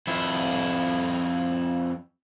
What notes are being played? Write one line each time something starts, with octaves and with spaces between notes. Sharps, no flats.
F2 E4